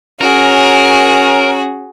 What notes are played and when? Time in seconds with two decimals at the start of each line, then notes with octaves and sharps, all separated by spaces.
0.21 C#4 F#4 G#4 A#4